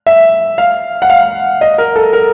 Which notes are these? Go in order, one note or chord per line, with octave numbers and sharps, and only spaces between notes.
E5
F5
F#5
F5
D#5
A#4
A4
A#4